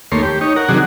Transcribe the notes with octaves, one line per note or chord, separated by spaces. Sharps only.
D#2 A3 A#3 C#5 C6
G4
D#4 C#5
A#4 F#5
C3 D#3 F#3 D4 F#4 G#4